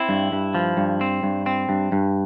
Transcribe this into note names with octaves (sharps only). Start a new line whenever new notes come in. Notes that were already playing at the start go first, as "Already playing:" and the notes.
Already playing: C4 E4
G2
G2
F3
G2
C4
G2
C4
G2
G2